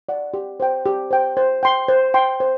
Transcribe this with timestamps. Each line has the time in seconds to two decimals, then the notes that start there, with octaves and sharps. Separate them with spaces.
0.09 D5 F#5
0.34 G4
0.60 C5 G5
0.85 G4
1.11 C5 G5
1.37 C5
1.63 G5 C6
1.88 C5
2.14 G5 C6
2.40 C5